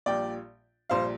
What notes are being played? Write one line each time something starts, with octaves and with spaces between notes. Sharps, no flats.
A#1 A#2 G3 D5 G5
A#1 A#2 G3 C5 F5